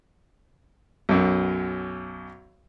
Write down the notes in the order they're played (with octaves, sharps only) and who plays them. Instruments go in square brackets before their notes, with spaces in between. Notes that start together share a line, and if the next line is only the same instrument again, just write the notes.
[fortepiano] B1 F#2